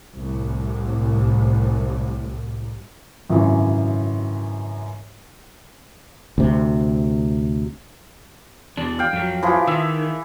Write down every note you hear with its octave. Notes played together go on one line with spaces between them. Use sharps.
C2 A2
G#1 F#2 C#3 E3
D2 C3
E2 D4
F5 G5
F2 F#3
E3 F3 G#4
D#3 E5